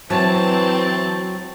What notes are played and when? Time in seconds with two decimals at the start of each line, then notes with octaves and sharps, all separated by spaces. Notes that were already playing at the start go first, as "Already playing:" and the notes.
0.10 E3 F#3 C4 A5